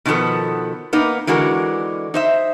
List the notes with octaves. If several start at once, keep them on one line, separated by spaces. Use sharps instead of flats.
B2 D#3 F3 B3 A4
A#3 B3 D#4
D3 E3 G#3 F#4 A#4
D#4 C5 E5